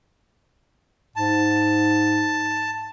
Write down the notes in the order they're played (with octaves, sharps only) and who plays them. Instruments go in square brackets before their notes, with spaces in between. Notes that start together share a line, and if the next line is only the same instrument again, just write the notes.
[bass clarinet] G#2 [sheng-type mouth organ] A5